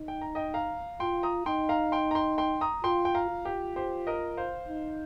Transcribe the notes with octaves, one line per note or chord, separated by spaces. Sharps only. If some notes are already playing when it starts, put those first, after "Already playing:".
Already playing: D#4
G5
A#5
D#5 G5
F5 A#5
F4 G5 C6
A#5 D#6
D#4 G5 C6
F5 A#5
G5 C6
A#5
G5 C6
G5 C6
A#5 D#6
F4 G5 C6
G5
F5 A#5
F4
G4
G4 C5
A#4 D#5
C5 F5
D#4